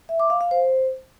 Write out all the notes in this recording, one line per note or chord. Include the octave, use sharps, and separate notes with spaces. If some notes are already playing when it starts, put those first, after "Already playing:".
E5
D6
F5
F5
C5